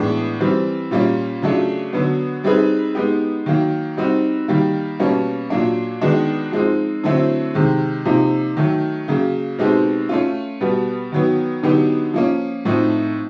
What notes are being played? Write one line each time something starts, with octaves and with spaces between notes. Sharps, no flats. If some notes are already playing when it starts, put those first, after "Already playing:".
Already playing: A2 E3 G#3 B3 D4
E3 G3 C4
A#2 G3 A#3 C#4
C#3 F#3 A3 D4 F4
D3 F#3 B3
G3 C4 D#4 G#4 B4
G#3 B3 D#4 G4
D#3 F#3 A#3
G3 C4 D#4 F#4
D#3 G3 A#3
B2 G3 A#3 C#4
A#2 F#3 A#3 D4
D#3 G#3 B3 D4 F#4
F3 G#3 C4 D#4
D3 F#3 A3 C4 E4
C3 D#3 G#3
C3 F3 A#3 D#4
D#3 F#3 A3
C#3 F#3 A#3
B2 G#3 C4 D#4 G4
A3 C#4 F4
B2 G3 B3
D#3 F#3 B3
D3 F#3 B3 D#4 G4
F3 A#3 C#4
A2 F3 A3 C4 D#4